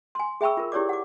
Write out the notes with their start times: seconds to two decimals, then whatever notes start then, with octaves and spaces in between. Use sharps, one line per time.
0.15 G#5 C6
0.41 G#4 E5 G5 B5 C#6 E6
0.57 F4 A#4
0.72 E4 G4 C#5 D5 D6
0.89 F#5 D6